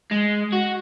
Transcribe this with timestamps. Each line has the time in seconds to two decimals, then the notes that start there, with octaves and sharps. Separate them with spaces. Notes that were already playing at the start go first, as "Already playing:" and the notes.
0.11 G#3
0.53 F#4